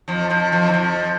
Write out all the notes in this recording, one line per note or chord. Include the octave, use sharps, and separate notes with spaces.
F2 F3
F2 F3
F2 F3
E3
F2 F3